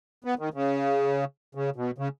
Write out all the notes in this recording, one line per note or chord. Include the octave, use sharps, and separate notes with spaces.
B3
D#3
C#3
C#3
B2
C#3